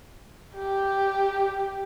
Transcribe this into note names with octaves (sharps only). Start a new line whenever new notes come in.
G4